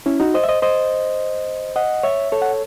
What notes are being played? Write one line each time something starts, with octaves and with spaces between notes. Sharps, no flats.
C#4 E4
D#4 F#4
C5 D#5
E5
C5 D#5
C5 D#5
D#5 F#5
C#5 E5
A4 C#5
F#5